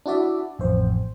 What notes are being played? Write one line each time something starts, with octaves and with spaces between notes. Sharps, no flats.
D4 E4 F#4 D5 E5
A1 F2 C5